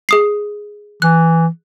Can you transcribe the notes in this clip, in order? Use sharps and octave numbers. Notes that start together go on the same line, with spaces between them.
G#4 D#6 C7
E3 F#6